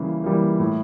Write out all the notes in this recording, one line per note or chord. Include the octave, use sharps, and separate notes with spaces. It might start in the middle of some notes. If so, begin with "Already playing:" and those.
Already playing: C#3 E3 G3 A#3
E3 G3 A#3
A2